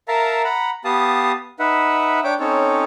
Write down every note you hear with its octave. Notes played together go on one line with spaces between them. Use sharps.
A#4 E5 F5 A5 A#5
F#5 A#5 B5
B3 G4 F5 A5 D#6
D#4 B4 E5 F#5
D4 C#5 G5 D6
C4 C#4 D#4 A4 C#5